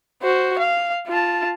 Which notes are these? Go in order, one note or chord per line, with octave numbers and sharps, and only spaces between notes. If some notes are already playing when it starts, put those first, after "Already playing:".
F#4 C5
F5
F4 A5